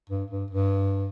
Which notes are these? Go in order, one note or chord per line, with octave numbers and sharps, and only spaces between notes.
G2
G2
G2